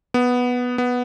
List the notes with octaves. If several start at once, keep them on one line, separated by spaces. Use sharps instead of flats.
B3
B3